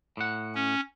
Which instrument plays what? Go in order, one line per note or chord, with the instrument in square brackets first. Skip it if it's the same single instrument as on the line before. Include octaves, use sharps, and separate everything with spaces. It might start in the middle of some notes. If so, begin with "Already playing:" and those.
[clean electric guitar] A2 F#5
[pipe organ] C#4